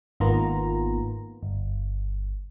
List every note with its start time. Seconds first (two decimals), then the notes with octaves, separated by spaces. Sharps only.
0.20 G#1 D#3 A#3 B3 F4 A#5
1.43 G1